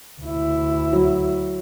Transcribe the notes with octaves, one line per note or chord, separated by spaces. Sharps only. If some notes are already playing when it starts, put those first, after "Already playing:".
D2 E4
F#3